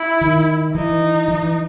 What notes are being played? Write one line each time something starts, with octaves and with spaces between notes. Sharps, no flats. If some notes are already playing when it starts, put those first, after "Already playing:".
Already playing: E4
D#3
E3 D#4
E3